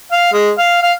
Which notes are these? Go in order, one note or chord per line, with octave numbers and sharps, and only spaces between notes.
F5
G#3
F5
F5